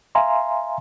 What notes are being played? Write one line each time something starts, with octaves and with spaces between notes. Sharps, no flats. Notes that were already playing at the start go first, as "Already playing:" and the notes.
E5 F5 G#5 A#5 C6